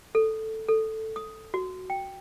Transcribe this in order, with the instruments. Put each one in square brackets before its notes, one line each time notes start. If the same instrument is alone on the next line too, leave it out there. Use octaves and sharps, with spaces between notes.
[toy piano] A4
A4
D#6
F#4
G5